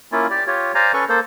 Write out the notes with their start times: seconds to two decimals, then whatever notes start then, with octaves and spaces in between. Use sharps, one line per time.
0.12 A#3 C#4 E4 F4
0.30 G4 D5
0.47 F4 G4 C#5
0.75 C5 D5 F5 G#5 A#5
0.93 C#4 A4 B4 C#6
1.09 A#3 A4 C5